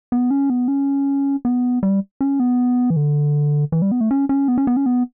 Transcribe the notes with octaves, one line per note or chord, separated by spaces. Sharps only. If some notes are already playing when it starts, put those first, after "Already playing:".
B3
C#4
B3
C#4
B3
G3
C#4
B3
E3
D3
E3
G3
B3
A3
C#4
C#4
B3
C#4
B3
C#4
B3